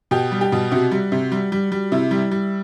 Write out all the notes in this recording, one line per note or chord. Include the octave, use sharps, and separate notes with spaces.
B2 G4
G3
G4
B2
C3 F#4
G3
C3
G3
G3
G3
C3 E4
G3
G3